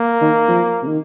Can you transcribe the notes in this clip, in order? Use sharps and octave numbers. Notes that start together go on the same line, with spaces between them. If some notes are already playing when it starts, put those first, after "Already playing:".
Already playing: A#3
D#3
F3
C3
D#3